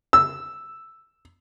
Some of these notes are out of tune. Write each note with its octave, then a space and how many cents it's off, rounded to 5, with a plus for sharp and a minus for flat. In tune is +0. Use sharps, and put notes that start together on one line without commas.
E6 +0